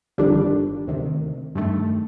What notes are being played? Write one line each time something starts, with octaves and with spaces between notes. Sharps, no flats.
G1 F2 D#3 G3 D4
D2 C3 D#3
G2 D#3 A3